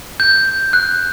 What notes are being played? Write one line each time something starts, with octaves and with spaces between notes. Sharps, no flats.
G6
F#6